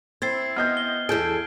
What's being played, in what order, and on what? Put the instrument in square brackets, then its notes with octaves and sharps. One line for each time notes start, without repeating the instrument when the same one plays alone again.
[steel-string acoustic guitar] C4 E4 [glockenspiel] G#6 A6 C7
[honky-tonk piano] B3 D#5 G6 [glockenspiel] F6
[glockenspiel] G7
[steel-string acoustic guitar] E2 A4 [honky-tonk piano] G#4 [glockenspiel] G6 D7